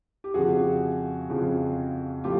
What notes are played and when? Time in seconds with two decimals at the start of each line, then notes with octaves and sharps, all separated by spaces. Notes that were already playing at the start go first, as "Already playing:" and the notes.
0.24 G4
0.34 F2 C#3 F3 F#4 G#4
1.30 F2 C#3 F3
2.24 A2 F3 F4 G4